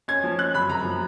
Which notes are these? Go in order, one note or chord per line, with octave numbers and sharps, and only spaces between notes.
C#4 G#6
F3
C#4 F#6
F#2 B5
F#2 A#5
F3